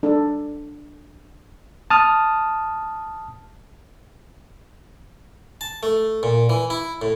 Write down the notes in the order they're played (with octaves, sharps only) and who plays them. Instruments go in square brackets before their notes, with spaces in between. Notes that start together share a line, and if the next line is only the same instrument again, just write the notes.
[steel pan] D4 A4
[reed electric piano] A5 D#6 F6
[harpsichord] A5
A3
A#2
E3
E4
A2